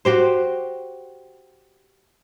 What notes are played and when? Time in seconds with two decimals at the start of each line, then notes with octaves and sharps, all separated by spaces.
0.05 F#4 G4 C5